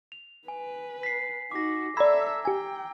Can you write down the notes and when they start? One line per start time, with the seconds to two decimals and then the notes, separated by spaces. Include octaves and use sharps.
0.12 F7
0.48 B4 G#5
1.03 B6 C7
1.52 D#4 F#4 D6 A#6
1.97 A4 D5 E5 A#5 B5 E6 G#6
2.45 G4 G5 G#5